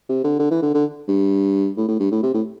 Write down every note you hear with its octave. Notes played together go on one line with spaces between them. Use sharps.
C3
D3
D3
E3
D3
D3
G2
A2
A2
G2
A2
C3
A2